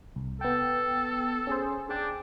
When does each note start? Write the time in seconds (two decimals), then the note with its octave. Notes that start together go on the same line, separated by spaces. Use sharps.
0.16 C2
0.41 B3 A4 G5
1.47 C#4 G#4 C5
1.89 D4 G#4 G5 D6